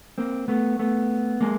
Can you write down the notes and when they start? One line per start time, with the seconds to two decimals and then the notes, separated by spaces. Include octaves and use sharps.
0.18 A#3 C4
0.48 A3 B3
0.79 A3 B3
1.41 G#3 A#3